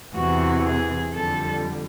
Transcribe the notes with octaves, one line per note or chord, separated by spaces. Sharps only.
E2 C3 E3 F#4
G#4
F2 D3 G3 A4